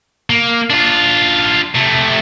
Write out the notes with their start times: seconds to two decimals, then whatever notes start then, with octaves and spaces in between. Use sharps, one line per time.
0.30 A#3
0.70 D4 F4
1.75 C3 A3